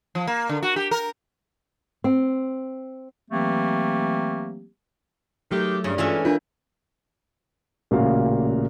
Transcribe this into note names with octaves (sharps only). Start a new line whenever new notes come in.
F3
A#3
D3
F#4
G4
A#4
C4
E3 F#3 A3 A#3 C4 G4
D#3 F#3 G#3 A3 G4
G2 C#3 C#4
E3 G#3 A3 C#4 F4 E5
D4 F4 A#4 B4
A1 A#2 C#3 A#3 F#4 F5